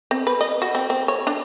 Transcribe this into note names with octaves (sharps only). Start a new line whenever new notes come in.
C4
B4
D#5
F#4
C4
C4
C#5
D4